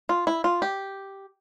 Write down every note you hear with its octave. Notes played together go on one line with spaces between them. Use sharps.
F4
E4
F4
G4